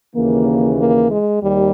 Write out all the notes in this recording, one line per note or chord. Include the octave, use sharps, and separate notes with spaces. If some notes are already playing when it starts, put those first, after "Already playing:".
D#2 C#3 E3 A#3
A#3
G#3
D#2 G3